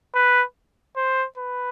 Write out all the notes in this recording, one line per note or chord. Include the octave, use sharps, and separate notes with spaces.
B4
C5
B4